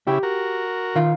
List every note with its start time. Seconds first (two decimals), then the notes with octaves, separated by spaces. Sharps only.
0.07 C#3 E4 G4
0.23 F#4 A#4
0.96 D#3 F4